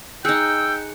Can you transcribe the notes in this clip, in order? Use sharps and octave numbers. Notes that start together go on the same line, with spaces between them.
D#4 G#4 G5 E6 F#6 C#7